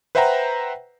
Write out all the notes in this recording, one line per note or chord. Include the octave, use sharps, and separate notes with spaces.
B4 C5 E5 F#5 G5 A#5